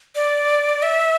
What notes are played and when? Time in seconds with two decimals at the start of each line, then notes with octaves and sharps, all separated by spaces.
0.15 D5
0.82 E5